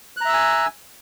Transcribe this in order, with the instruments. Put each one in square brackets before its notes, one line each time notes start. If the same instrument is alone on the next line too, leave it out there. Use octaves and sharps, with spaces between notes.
[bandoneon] F#6
A#5
E5
E6
G#5